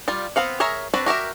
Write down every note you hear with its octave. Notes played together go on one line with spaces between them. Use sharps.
G3 F4
B3 C4 F5 F#5
G#4 A#4 C#5 E5 A#5
C4 D4 F#4 B4
F#4 G4 A#4 E5